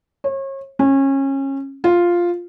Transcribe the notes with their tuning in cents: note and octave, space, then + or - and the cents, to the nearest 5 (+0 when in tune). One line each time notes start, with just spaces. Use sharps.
C#5 -35
C#4 -25
F4 +0